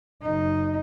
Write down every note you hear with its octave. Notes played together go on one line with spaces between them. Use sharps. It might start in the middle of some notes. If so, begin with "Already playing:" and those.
F#1 D#4